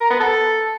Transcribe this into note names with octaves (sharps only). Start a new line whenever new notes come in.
A#4
B3
A4